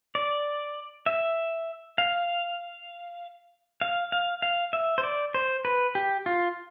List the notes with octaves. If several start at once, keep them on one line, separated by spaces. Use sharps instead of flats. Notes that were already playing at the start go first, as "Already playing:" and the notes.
D5
E5
F5
F5
F5
F5
E5
C5
D5
C5
B4
G4
F4